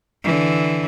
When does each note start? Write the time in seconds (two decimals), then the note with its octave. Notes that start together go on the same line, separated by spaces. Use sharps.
0.23 D3 E3